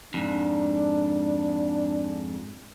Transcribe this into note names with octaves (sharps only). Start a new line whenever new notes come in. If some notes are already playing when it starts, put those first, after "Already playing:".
F2 G#2 D4